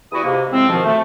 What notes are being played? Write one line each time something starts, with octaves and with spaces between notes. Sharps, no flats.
E2 G3 E4 F#4 D#6
G#2 C3 A#3
A2 F3 G#3 C4
F2 G#2 B2 D#3 F3
A3